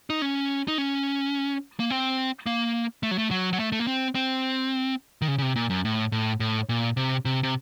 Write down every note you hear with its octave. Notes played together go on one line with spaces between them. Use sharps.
D#4
C#4
D#4
C#4
A#3
C4
A#3
A3
F#3
A3
F#3
F#3
A3
A3
A#3
C4
C4
D#3
C#3
C#3
C3
A#2
F#2
A2
A2
A2
A#2
C3
C3
C3